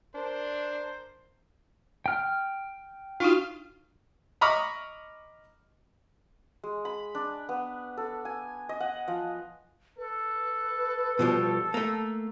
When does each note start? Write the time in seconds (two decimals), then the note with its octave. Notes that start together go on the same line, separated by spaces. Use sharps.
0.15 D4 A#4 C5
2.06 G5 F6
3.20 D4 D#4 F4 F#4
4.41 D#5 A#5 B5 C#6 D6 F6
6.64 G#3
6.85 B5
7.15 D4
7.49 B3
7.97 A4
8.25 G#5
8.69 D#5
8.80 F#5
9.08 F3
9.97 A4 B4
11.19 B2 F3 G3
11.74 A3 A#3